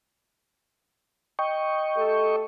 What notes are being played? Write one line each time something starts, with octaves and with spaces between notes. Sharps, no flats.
D#5 G5 C#6
A3 G4 A4